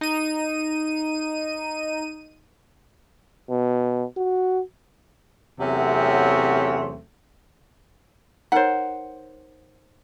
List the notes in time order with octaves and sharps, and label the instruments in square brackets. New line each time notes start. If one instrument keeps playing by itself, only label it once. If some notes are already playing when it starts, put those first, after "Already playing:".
[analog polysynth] D#4 D#7
[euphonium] B2
F#4
[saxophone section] E2 C3 F#3 A3 C4 C#4
[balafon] D#4 A#4 C#5 [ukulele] C5 F#5